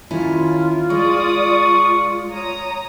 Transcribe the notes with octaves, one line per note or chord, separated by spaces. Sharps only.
D#2 C#4 E4 F4
G#3 D5 C#6 D#6
C#5 A#5 D#6